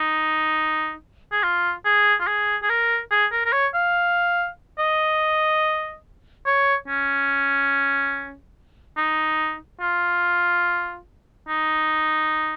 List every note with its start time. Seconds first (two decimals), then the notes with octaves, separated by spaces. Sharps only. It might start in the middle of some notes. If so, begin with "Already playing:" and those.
Already playing: D#4
1.32 G#4
1.43 F4
1.85 G#4
2.20 F4
2.27 G#4
2.63 G#4
2.69 A#4
3.11 G#4
3.32 A#4
3.45 A#4
3.52 C#5
3.74 F5
4.78 D#5
6.46 C#5
6.88 C#4
8.97 D#4
9.81 F4
11.48 D#4